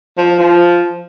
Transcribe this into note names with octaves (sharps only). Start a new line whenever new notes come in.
F3
F3